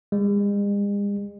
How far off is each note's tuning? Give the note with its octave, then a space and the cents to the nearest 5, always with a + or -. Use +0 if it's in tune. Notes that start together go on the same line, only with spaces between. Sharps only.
G#3 -45